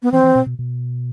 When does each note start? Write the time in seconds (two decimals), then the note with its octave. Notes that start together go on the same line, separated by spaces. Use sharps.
0.02 B3
0.12 E3 C4
0.24 E3
0.35 B2
0.46 B2
0.59 B2